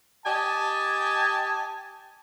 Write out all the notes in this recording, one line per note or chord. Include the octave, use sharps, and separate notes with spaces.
G4 D#5 G#5 A5